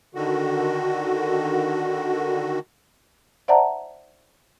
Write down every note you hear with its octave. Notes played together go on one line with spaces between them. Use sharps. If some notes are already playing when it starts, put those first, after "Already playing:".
D3 D#3 F#4
C5 D5 E5 F#5 A5 A#5